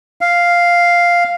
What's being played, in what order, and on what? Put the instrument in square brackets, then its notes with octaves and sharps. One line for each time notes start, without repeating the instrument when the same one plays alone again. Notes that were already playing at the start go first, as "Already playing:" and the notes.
[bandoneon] F5